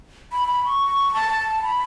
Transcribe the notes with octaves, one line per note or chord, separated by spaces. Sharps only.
B5
B5
C#6
A5
B5